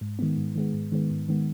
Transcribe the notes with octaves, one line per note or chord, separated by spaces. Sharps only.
G#2
D#3 G#3 B3
G#2
D#3 G#3 B3
G#2
D#3 G#3 B3
G#2
D#3 G#3 B3